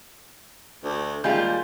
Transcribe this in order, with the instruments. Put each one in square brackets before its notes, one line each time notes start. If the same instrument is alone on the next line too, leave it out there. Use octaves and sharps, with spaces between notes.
[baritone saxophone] D2
[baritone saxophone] D#2 [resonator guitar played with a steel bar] G3 F4 [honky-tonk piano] G#3 G#5 G6